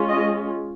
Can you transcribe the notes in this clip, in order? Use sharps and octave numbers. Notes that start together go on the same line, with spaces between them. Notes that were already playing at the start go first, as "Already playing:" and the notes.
Already playing: G#3 C#4 F4
D#5